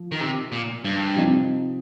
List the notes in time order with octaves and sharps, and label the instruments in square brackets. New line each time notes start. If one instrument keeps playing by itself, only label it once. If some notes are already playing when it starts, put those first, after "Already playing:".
Already playing: [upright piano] F3
[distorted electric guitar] D#3
C3
A#2
G2
[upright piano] C3 F3 C4 D#4